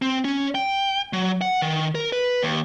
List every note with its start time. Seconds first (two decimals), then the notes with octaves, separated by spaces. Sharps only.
0.02 C4
0.25 C#4
0.55 G5
1.13 F#3
1.41 F#5
1.62 D#3
1.95 A#4
2.12 B4
2.43 D#2